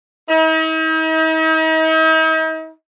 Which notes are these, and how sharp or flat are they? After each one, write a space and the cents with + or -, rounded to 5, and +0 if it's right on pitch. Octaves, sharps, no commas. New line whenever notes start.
D#4 +45